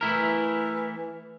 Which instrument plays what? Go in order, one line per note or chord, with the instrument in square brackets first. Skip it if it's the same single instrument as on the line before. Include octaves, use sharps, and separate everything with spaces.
[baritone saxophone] E3 [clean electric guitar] A3 E4 A#4